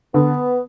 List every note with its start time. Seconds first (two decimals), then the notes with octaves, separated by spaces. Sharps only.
0.14 D3 B3